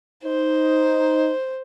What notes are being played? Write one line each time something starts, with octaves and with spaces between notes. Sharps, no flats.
D#4 C5